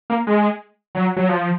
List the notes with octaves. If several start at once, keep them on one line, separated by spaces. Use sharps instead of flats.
A#3
G#3
F#3
F#3
F3